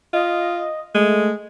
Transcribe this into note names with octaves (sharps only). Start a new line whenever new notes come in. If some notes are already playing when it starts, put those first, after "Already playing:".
F4 D#5
G#3 A3